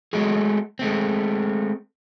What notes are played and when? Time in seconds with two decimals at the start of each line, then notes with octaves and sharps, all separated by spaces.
0.13 F#3 G#3 A3 F#4 G#4
0.79 G#3 A3 C4